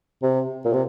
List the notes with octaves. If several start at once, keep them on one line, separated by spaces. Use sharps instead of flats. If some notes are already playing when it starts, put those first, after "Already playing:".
C3
A#2
C3